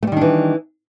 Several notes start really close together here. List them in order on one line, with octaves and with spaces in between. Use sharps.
A3 G3 D#3 D4 E3